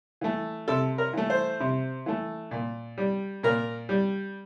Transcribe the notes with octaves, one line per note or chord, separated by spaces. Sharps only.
E3 A3
C3 A4
A#4
E3 A3
C5
C3
E3 A3
A#2
G3
A#2 A#4
G3